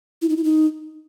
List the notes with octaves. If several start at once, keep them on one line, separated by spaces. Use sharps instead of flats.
E4
D#4
E4
D#4